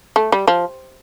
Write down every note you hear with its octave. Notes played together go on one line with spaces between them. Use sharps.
A3
G3
F3